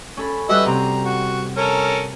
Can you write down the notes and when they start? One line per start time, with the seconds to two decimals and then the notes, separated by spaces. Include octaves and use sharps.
0.17 C#4 A4 B5
0.49 G3 F#4 B4 D#5 E5
0.66 C3 C4 A#5
1.05 F#4
1.57 C#4 A4 A#4